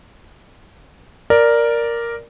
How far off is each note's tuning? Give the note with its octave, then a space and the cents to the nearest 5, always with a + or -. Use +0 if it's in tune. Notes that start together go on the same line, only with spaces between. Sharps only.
A#4 +0 D5 +0